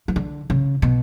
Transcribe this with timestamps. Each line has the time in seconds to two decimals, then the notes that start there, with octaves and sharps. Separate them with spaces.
0.08 E3
0.16 D3
0.50 C#3
0.82 B2